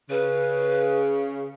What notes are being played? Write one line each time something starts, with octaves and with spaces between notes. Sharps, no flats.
C#3 B4